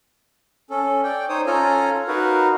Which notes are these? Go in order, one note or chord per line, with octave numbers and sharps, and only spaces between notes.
C#4 A4
D5 G5
D#4 C5 C#5 D#6
C#4 F4 A4 G#5 A#5
D#4 F#4 A#4 B4 F5